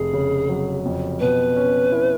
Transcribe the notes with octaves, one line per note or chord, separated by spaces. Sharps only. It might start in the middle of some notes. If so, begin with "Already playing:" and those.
Already playing: F1 G#4
C#3
F#3
F2
B2 B4
C#4
E4